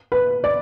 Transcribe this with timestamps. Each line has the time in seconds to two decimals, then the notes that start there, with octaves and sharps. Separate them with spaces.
0.12 B4
0.44 D5